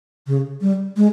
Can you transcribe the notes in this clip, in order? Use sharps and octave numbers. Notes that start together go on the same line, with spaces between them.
C#3
G3
G#3